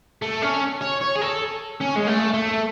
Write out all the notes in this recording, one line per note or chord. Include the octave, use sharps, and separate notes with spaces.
A3
C#4
C#5
C#5
G#4
A4
C#4
G#3
A3
A3